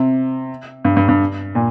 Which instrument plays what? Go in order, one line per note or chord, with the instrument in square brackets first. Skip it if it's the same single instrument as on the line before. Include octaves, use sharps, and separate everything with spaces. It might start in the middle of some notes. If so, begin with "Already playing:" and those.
Already playing: [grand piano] C3
G2
G2
G2
A#2